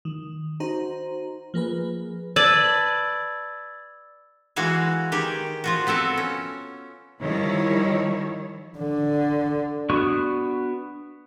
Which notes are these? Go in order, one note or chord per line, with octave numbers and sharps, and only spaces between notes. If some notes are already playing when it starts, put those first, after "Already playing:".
D#3
D#4 F#4 C5 A#5
F3 A#3 G#4 B4
B4 D5 A5 E6 G#6 A6
E3 G#3 F#4 F5 G#5
D#3 G4 G#4
F3 F4 F#4
B3 C4 A4 A#4
C#4
D#3 F3 G3 E4 C#5
D3
B3 D4 F#4 C#6